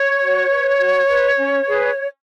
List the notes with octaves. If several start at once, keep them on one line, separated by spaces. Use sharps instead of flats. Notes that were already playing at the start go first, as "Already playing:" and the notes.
Already playing: C#5
F#4
B4
F#4
B4
C#4
G#4 B4